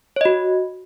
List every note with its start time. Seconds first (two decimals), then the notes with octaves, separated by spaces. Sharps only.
0.16 C#5
0.21 D#5
0.25 F#4